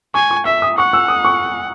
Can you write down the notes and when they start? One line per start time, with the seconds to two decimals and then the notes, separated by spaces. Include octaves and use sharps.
0.14 G#5 C#6
0.31 C#6
0.45 E5 E6
0.62 D#6
0.78 F#5 C#6
0.93 E6
1.08 D#6
1.25 C#6